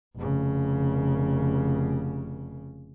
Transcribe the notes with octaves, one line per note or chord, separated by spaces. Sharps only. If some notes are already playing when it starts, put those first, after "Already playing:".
F1 C#3